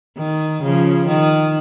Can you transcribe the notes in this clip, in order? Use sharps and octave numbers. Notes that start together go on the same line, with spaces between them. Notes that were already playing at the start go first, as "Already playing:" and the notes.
D#3
C#3 F3
D#3